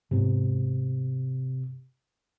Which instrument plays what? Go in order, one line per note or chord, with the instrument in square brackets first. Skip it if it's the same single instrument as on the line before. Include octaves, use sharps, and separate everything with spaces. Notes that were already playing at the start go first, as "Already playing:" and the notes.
[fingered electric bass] G#2 G#3 B3 [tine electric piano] C3